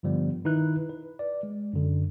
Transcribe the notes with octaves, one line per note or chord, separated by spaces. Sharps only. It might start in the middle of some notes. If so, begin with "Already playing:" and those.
G2 D3 F3 G3 B3
D#3 D#4 E4 B4 F#6
B4
D5
G#3
F#2 D3